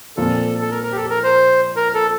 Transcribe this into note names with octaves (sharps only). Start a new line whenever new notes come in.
A#2 F3 C4 F4 A4
A4
A#4
A#4
G4
A4
A#4
C5
A#4
A4